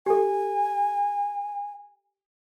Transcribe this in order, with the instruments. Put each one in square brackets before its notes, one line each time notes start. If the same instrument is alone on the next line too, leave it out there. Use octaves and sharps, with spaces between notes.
[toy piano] G4 A4 [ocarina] G#5